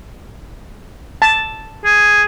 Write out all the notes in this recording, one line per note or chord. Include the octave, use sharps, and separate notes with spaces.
A5
G#4